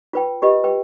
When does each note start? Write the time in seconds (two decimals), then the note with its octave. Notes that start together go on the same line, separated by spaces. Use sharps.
0.13 F4 B4 G5
0.42 F4 G4 B4 D#5
0.64 B4 G5